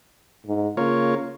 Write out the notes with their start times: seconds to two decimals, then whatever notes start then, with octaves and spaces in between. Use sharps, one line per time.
0.47 G#2
0.77 C#3 A#3 F4 C#5